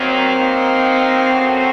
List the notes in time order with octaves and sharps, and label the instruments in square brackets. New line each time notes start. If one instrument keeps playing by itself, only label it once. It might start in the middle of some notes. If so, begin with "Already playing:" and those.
Already playing: [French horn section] D#3 F#3 A#3 [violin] C4
[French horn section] F#3 A#3 D#4
A2 F#3 A3 C#4 F#4